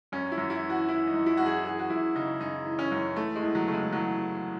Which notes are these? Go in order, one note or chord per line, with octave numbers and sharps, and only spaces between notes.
F#2 C#4
E4
F#2
E4
E3
F#4
E3 E4
D#4
F#2
E4
F#2 F#4
G#4
E3 G#4
F#4
F#2 E4
C#3 D#4
F#2 D#4
E3
C#4
F#2
E3 A3
G#3
E2
F#3
C#3 A3
G#3
E2 F#3
E3